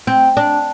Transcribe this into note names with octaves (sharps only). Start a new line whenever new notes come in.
C4
D4